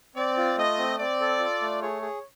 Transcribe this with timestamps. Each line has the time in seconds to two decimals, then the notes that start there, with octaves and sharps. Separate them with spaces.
0.16 C4 D5
0.37 F4
0.57 A3 D#5
0.78 C4
0.99 C4 D5
1.20 A4
1.40 F4
1.61 A3
1.82 G#4 C#5
2.02 G#4